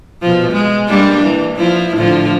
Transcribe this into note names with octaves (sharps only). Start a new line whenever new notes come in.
B2 F3
G#3
G3 A#3 D4
E3
F3 E4
A2 D3 F3